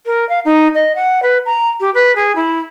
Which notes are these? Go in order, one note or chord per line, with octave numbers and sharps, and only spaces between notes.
A#4
F5
D#4
D#5
F#5
B4
A#5
G4
B4
G#4
E4